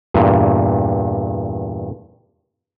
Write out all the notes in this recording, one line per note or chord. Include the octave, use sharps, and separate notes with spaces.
E2 G2 A#2